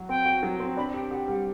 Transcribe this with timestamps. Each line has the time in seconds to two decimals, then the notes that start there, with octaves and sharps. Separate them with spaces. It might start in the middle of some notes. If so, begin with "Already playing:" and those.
Already playing: F#3 F#4
0.09 C4 G5
0.25 F#4
0.43 F#3
0.60 C4
0.77 D4 B5
0.94 G4 G5
1.10 G4 F#5
1.28 G3 F#5